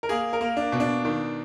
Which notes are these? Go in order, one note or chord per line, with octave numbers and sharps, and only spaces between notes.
A#4
A#3 G#4
A#4
A#3
D4
B2
D4
D#3